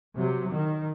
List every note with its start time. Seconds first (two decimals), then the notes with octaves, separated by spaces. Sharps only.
0.17 C3 F#3
0.52 D#3